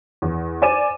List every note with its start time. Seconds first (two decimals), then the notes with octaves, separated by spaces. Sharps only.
0.22 E2
0.62 C5 D5 G#5 D6 D#7 E7